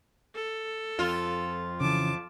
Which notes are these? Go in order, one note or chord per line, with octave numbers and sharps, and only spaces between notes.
A4
F2 F4
C#3 E3 A5 D6